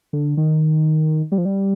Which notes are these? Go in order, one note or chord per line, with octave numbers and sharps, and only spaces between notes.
D3
D#3
G3
F3
G3